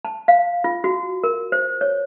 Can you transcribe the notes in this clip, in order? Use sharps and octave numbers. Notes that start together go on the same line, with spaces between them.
A5
F5
F4
F#4
A#4
C5
C#5